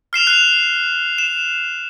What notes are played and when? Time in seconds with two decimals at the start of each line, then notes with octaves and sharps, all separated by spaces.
0.13 F6 C7 E7 F7
0.27 F#6 F7
1.18 E7